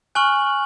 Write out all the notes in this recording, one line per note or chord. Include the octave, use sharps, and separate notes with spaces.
G#5 C#6 F6 F#6 F#7